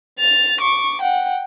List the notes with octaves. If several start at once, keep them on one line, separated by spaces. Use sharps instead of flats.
A6 F7
C#6 D6
F#5 G5